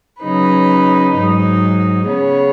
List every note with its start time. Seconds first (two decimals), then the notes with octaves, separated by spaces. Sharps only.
0.22 C#3 F#3 D#4 B4
1.15 G#2 F#3 D#4
2.07 C#3 B3 G#4 C#5